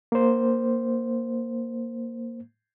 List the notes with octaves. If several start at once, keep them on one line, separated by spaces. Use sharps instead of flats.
A#3 C5